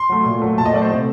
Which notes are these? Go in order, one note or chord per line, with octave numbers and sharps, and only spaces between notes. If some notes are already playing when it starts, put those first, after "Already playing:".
Already playing: C6
F#3 A3
A#2
F#3 A3
A#2 A5
D#5
F#3 A3 D5
C5
C3